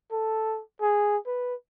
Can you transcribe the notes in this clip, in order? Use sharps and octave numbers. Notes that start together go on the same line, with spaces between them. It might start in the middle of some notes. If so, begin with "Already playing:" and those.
A4
G#4
B4